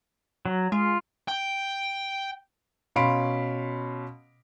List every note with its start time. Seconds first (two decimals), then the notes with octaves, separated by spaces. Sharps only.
0.46 F#3
0.72 G#3 F4
1.28 G5
2.96 B2 C#4 F5 B5 C6 D7